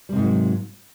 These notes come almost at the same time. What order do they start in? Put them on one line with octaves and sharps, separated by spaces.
G3 C3 G#2 A#3 F#3